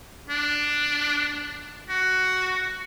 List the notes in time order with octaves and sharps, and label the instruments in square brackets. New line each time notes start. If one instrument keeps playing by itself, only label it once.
[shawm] D4
F#4